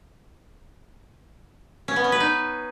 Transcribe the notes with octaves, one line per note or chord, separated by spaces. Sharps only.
C#4
B3
C#4
B4
D#4